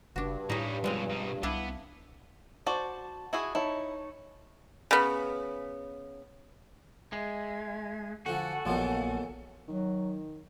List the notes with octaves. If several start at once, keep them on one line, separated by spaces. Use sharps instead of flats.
F#1 G2 D4 F#4
A2 G3 C#4 D#4 G#4
B2 F3 G3 G#3 C4 C#4
B2 D#4
C2 B3 D4 E4 F5
F#4 C5 D5 A5
E4 F#4 G#4
D#4 E4 C#5 A5
C#3 B3
G#3 E5 G#6
D3 F3 F#4 A4 F#5 G#5
A#1 B2 D#3 F3 F#3
D#3 F#3